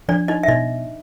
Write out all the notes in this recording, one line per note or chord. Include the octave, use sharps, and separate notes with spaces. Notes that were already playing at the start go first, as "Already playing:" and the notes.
F3 D4 D5
D#4 D#5
E5
B2 D#4 D#5